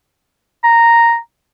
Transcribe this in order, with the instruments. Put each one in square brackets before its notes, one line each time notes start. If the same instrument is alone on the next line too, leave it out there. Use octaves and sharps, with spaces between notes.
[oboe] A#5